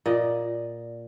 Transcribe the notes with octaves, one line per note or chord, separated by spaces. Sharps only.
A#2 D5 D#5